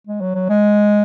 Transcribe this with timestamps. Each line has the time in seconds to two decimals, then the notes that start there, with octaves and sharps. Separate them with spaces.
0.07 G#3
0.21 F#3
0.35 F#3
0.49 G#3